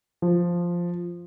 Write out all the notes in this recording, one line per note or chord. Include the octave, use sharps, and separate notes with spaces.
F3